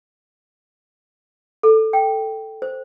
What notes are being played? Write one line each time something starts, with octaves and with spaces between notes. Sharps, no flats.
A4
G5
C5